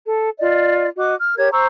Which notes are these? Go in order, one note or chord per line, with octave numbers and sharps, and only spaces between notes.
A4
F4 D5 D#5
F#4 D#5 D6
F6
G4 A#4 C#5 G#6
C5 A#5 C#6 E6